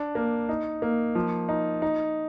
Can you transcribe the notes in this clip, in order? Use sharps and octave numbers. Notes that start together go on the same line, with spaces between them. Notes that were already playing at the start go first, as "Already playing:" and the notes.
Already playing: D4
A#3
D#4
A#3
F3
D#4
D#4